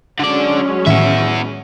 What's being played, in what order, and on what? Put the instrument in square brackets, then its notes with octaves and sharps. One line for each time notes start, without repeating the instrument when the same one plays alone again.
[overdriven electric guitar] D3 D5 [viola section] F#3 G#3 C#4
[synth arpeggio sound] A2 D#3 E3 [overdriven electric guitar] B3 E5